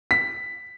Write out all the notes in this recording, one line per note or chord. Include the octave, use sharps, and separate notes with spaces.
B6